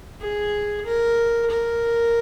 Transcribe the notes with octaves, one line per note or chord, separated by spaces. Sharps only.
G#4
A#4
A#4